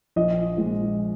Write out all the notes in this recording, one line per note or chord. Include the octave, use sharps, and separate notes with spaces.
A#1 D#5
A#2 G#3